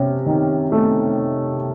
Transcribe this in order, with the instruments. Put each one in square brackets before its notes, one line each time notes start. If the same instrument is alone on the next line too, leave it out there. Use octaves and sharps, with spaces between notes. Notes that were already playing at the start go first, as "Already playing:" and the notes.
Already playing: [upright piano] C3 C#4
D#3
A3